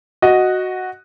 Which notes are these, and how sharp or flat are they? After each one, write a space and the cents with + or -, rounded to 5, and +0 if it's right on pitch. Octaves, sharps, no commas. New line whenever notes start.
F#4 +0 D#5 +0